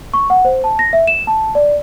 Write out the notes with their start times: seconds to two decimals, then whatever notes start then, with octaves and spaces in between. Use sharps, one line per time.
0.14 C#6
0.30 F#5
0.45 C5
0.64 A5
0.79 A#6
0.93 E5
1.07 E7
1.27 A5
1.55 D5